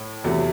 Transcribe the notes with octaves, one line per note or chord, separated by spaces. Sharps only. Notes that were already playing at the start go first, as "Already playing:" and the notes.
Already playing: A2
E2 C3 F#3 A3